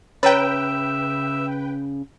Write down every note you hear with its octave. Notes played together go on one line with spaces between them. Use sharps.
C#3 B4 C#5 E5 G5 A#5